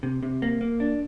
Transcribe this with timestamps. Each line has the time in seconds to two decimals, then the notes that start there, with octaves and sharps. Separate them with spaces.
0.03 C3
0.23 C3
0.42 A#3
0.61 A#3
0.80 D4